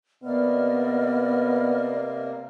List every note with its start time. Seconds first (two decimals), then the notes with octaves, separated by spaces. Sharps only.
0.23 C3 A#3 B3 D5 D#5 F6